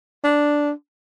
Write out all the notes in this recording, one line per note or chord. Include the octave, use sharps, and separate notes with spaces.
D4